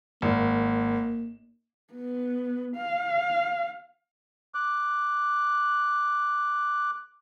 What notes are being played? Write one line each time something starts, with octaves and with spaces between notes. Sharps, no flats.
G#1 A#3
B3
F5
D6 F#6